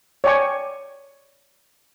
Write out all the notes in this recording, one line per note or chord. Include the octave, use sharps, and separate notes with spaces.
C#5 D5 G5 G#5 C#6